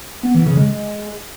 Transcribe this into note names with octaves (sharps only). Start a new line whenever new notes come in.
B3
E3
C#3
G#3